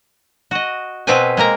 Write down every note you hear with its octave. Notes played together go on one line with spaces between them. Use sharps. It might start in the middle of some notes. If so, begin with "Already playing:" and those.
F#4 D#5
B2 C4 F4 A4 B4 G#5
G#3 A#3 A#4 A#5